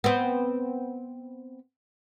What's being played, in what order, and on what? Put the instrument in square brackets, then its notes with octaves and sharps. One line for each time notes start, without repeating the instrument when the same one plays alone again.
[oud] B3 C4